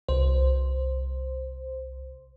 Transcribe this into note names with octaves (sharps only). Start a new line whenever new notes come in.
C2 C5